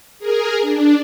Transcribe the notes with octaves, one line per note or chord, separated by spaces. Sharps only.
G#4 A#4
D4